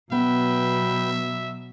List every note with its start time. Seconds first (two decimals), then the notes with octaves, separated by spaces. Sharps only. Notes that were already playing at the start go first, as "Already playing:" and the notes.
0.12 B2 F#3 B3 B4 E5 G5